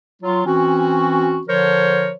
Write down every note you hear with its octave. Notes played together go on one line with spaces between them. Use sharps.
F#3 F4
E3 C4 C#4 F#4
D3 F3 A#4 C5 C#5